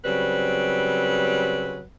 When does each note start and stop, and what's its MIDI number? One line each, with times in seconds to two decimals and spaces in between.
0.05 1.82 49
0.05 1.82 54
0.05 1.82 55
0.05 1.82 60
0.05 1.82 71